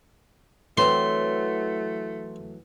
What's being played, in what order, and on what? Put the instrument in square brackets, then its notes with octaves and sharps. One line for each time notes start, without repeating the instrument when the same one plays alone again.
[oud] E3 F#3 C4 [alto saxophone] A3 [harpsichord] C6